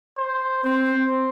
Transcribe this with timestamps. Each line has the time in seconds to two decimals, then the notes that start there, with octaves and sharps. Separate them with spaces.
0.17 C5
0.64 C4 C5